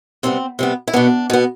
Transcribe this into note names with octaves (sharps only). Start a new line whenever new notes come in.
C3 G3 B3 C4
C3 G3 B3
E4
B2 B3 D4
B2 B3